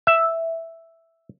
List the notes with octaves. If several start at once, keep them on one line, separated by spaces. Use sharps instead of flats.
E5